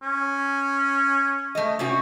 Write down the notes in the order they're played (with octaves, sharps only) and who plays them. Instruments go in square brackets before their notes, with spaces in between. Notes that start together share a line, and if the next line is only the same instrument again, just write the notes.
[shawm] C#4
[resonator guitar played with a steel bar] A3 D#5
C3 C#4 F#4